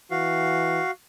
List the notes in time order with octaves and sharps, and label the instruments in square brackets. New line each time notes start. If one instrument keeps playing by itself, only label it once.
[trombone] E3 [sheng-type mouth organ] F#4 F5